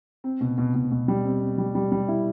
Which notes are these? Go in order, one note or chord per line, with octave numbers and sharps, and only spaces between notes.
C4
B2
B2
B2
B2
G3
C4
C4
G3
G3
G3
E4